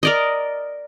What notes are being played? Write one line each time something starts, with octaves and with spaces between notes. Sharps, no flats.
A#4 D5 D#5